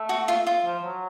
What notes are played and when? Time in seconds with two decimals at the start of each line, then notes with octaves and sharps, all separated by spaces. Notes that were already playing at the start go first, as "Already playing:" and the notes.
Already playing: A3
0.09 F#4
0.28 F4
0.47 F4
0.65 F3
0.84 F#3